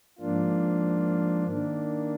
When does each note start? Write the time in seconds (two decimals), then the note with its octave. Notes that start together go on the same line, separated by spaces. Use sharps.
0.19 G#2 F3 A#3 D4 F4
1.47 D#3 A#3 D4